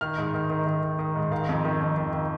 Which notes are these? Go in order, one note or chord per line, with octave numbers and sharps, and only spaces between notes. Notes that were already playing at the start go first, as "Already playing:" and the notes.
D#3 F6
G#2
D#3
D#3
D#3
D#3
D#3
G#2
D#3 F5
F2
D#3
F2
D#3
D#3